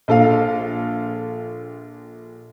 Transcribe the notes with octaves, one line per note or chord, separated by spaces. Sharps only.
A#1 A4 F5